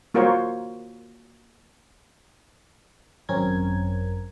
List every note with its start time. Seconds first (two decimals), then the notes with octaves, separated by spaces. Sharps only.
0.14 A#3 F4 F#4 A#4 C5 C#5
3.29 G#1 F#2 C4 C#4 A#4 G#6